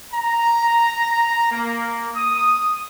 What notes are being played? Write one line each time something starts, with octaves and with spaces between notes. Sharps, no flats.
A#5
A#3
D#6